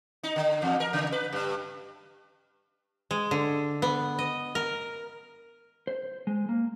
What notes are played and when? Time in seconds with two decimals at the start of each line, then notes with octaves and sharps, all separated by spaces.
0.23 D#4
0.36 D3
0.62 E2
0.80 A#4
0.93 C#3
1.12 B4
1.33 G2
3.11 G#3
3.31 D3
3.82 B3
4.19 D#5
4.55 A#4
5.87 C5
6.27 G#3
6.49 A#3